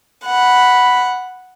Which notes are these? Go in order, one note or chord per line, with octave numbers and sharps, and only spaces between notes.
F#5 B5